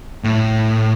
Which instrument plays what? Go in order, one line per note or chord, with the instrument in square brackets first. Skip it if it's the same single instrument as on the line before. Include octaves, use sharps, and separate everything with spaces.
[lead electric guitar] A2